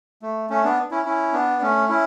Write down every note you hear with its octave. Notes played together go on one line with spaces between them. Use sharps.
A3
A3 C#4
B3 D4
C#4 E4
C#4 E4
B3 D4
A3 C#4
C#4 E4